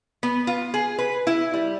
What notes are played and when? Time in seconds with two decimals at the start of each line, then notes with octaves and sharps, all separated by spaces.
0.23 B3
0.47 F4
0.74 G#4
0.99 B4
1.27 E4
1.54 G3